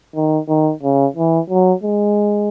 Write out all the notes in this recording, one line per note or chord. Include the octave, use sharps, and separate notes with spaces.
D#3
D#3
C#3
E3
F#3
G#3